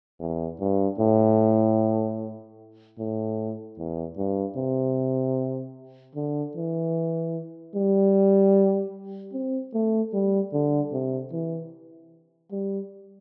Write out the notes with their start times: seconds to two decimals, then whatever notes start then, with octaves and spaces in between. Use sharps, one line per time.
0.20 E2
0.60 G2
0.99 A2
2.98 A2
3.78 E2
4.17 G2
4.56 C3
6.15 D3
6.56 E3
7.75 G3
9.33 C4
9.74 A3
10.13 G3
10.53 D3
10.92 C3
11.32 E3
12.52 G3